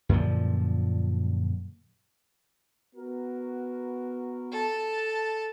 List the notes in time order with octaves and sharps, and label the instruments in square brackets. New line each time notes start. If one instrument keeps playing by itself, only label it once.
[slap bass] F#2 A#2 D3 F3
[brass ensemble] B3 F#4 A#4
[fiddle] A4 A5